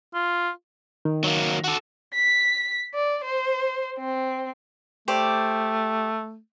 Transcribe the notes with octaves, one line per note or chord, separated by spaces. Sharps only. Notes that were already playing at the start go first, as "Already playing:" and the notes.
F4
D#3
F#3 A#3
F#4 A4
B6
D5
C5
C4
A3 G4 C5 D5